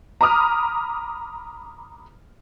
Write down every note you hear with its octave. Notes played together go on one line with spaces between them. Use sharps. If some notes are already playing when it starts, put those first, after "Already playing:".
A#5 B5 D6 D#6 F6